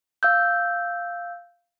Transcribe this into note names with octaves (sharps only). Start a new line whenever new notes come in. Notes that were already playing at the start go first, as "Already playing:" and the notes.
F5 E6 G6